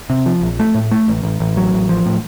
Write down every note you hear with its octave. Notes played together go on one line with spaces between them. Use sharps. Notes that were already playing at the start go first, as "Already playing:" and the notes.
C3
F3
A#1
A3
A2
A3
A1
A1
A1
F#3
A1
F3
A2